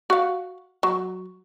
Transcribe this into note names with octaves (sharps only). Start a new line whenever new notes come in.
F#4 F5
F#3